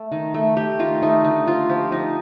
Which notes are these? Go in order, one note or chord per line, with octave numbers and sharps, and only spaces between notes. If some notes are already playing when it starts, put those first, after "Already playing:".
Already playing: A3
D#3
A3
A3 G4
D#3 F4
A3 D#4
D3 D#4
F3 F4
F3 G4
F3 D#4